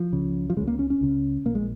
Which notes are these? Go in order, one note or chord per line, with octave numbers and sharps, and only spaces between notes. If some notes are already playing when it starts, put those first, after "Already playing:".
Already playing: F3
C#2 C#3
F3
C#2 C#3 G#3
A#3
C#4
C#4
C#2 C#3
A#1 A#2 A#3
G#3